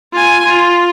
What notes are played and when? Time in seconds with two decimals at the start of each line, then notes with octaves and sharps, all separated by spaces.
0.13 F4 G#5
0.45 F4